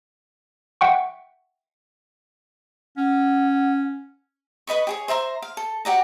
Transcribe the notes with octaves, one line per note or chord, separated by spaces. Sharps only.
E5 F#5 G5 C#6
C#4 F#5
B4 D#5 B5 C#6
G4 G#4 C#5
C5 E5 A#5 C6
F5
A4
F#4 G4 D5 A#5